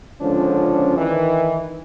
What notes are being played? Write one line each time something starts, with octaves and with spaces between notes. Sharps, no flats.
C#2 D3 F3 C#4 D4
D#3 E3